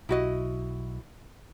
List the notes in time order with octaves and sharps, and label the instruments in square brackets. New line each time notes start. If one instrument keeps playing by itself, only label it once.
[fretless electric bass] B1 [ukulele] E4 F#4 D#5